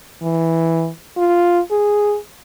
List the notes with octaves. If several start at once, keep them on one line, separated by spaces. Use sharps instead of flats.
E3
F4
G#4